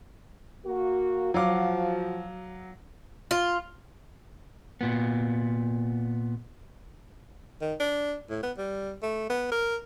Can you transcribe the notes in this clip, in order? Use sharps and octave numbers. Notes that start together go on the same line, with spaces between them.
A#3 F#4
F3 F#3 F#4 F5 D6
F4
A#2 B3
D#3
D4
A2
B3
G3
A3
B3
A#4